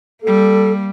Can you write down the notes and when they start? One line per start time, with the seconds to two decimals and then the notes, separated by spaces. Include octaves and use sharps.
0.23 G3 A#3 A4